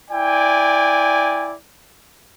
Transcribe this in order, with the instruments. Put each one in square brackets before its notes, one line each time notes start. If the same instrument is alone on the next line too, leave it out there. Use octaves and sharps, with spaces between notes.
[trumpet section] E4 D5 G5 G#5